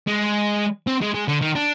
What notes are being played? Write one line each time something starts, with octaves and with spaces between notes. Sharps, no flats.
G#3
C4
G#3
G#3
D3
D#3
D4